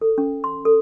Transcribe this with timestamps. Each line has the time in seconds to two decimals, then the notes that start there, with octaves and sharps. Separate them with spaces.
0.01 A4
0.18 C#4
0.44 C6
0.65 A4